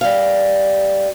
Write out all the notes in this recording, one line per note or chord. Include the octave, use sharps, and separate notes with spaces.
G3 F5